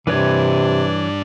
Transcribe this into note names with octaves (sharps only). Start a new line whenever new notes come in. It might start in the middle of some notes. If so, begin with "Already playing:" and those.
G2 C3 E3 D4 B4 C#5